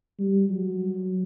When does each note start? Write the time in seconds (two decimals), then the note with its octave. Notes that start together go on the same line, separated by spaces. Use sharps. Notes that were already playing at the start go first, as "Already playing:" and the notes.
0.19 G3
0.49 F#3